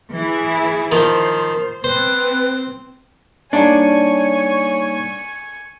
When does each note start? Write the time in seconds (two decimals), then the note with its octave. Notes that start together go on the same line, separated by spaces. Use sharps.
0.13 E3 E4 G#4
0.92 D#3 F3 C5
1.84 C4 B4 C5
3.53 G3 A#3 D4 D#4 C#5 G#5 C#6